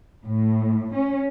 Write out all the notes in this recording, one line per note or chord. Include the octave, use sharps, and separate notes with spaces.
A2
C#4